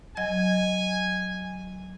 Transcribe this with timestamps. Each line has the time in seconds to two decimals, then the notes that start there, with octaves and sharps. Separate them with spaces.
0.17 F#3 D#5 G#5 G#6